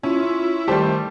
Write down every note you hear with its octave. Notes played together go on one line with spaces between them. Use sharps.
C#4 E4 F4
D#3 G3 A3 G4 C5